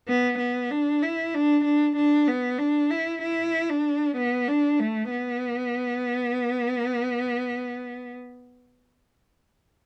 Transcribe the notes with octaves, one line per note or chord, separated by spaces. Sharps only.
B3
B3
D4
E4
D4
D4
D4
B3
D4
E4
E4
D4
B3
D4
A3
B3